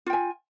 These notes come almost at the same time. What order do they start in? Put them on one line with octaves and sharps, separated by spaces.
F4 G5 G#5